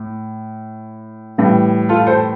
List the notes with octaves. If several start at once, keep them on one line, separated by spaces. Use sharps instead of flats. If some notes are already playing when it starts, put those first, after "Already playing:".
Already playing: A2
A2 E3 G3
F4 A4
A4 C5